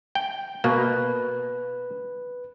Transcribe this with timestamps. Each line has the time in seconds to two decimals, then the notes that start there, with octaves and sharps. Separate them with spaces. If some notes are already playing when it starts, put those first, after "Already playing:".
0.15 G5
0.64 B2 A#3 B4